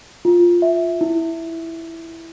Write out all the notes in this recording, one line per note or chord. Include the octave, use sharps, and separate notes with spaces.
F4
E5
E4